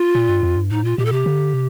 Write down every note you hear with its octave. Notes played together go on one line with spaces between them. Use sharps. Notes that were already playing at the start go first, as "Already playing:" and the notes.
Already playing: F4
A#2
G2
F2
G2
A2 D#4
A#2 F4
A#2 G4
A4
C3 G4
D3
C3